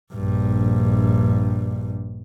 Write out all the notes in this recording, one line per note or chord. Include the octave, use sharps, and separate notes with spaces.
A#1 G2